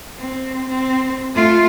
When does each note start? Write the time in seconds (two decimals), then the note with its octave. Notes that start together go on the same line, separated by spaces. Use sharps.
0.18 C4
0.69 C4
1.35 A3 F4